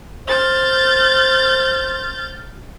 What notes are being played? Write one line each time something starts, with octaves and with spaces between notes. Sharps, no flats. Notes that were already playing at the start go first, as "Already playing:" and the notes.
C5 F6 G6 A6